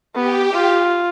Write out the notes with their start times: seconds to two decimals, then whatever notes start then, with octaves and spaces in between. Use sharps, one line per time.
0.15 B3 G4
0.53 F4